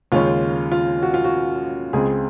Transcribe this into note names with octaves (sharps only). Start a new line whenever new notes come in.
D#2 C#3 G#3 C#4 F4
F4
F#4
F4
F#4
C#2 C#3 G#3 C4 G#4